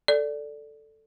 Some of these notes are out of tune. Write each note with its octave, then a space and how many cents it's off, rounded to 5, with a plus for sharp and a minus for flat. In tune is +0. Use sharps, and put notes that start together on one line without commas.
A4 +5 D5 +0